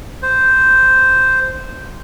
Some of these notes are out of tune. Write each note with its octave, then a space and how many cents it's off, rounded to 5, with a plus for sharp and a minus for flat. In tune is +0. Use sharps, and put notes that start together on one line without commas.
C5 -5